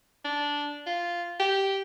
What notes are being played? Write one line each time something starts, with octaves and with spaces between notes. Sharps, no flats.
D4
F4
G4